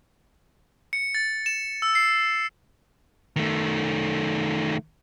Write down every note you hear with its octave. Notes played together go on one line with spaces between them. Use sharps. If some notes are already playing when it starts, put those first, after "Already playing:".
C#7
A6
E7
E6
C7
D#3 A3